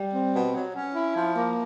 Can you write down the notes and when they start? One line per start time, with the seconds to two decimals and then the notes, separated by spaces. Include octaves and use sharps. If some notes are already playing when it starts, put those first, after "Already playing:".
Already playing: G3
0.13 C4
0.34 B2
0.54 F#3
0.74 C#4
0.94 E4
1.14 F3
1.34 A#3